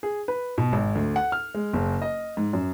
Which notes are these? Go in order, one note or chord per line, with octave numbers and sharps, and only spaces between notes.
G#4
B4
B2
G#1
D2
F#5
F6
G#3
F#1
D#5
G#2
F#2